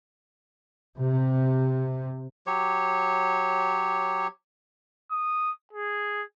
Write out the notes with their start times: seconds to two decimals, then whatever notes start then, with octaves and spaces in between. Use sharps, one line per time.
0.98 C3
2.47 F#3 G4 C#5
5.12 D#6
5.73 G#4